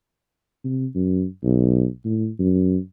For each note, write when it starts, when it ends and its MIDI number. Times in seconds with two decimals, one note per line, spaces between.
0.64 0.86 48
0.95 1.24 42
1.44 1.87 35
2.05 2.28 45
2.39 2.77 42